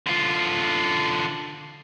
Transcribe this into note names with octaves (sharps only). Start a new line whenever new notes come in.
D3 F4